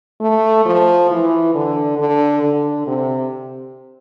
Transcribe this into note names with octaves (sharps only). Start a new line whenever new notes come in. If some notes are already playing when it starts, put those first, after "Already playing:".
A3
F3
E3
D3
D3
D3
C3